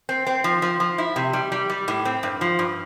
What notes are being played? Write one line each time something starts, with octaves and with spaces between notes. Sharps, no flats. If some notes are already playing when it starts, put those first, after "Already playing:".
C4
C4
F3
F3
F3
E4
C3
G3
G3
G3
A2
C4
G2
F3
G2